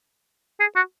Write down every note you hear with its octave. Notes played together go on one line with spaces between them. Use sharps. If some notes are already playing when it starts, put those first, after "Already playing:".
G#4
F#4